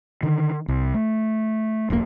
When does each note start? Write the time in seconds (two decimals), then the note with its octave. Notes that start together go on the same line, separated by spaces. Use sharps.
0.23 D3 D#3
0.68 C2
0.94 A3
1.90 E1 B1 C3 A#3